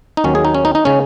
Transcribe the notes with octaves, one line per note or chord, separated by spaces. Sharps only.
D#4
D#2 D#3 F#3 C#4
G#4
D#4
C#4
D#4
D#4
C#3 G#3 C#4